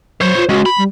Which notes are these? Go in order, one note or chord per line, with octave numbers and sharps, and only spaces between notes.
F#3 C5 C#5
F4
G#3 C#4 F#4
B5
G3